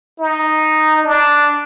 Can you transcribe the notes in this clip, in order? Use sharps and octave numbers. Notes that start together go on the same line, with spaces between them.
D#4
D4